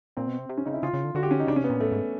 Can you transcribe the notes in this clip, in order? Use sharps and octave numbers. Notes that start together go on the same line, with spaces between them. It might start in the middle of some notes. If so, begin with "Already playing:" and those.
A#2 C4
B2
C3
C3
C#4
C#3 D#4
E4
C#3 F4
C#3
D3
D3 F#4
G4
C#4
D#4
C#3 D4
C3 C#4
B3
A#2
A2 A3
G#2